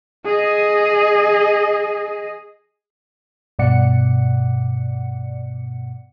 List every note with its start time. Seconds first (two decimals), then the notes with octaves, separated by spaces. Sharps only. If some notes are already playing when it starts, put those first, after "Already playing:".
0.25 G#4 D#5
3.59 G2 B2 D5 F#5 C#7